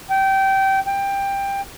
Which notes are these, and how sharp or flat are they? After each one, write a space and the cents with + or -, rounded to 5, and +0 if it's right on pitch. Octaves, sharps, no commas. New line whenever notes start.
G5 -20
G5 +15